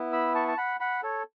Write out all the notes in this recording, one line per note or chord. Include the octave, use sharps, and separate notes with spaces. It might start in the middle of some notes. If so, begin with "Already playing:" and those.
Already playing: B3 E4
B5 E6
A5 C#6
A5
F#5 B5
F#5 B5
A4 C#5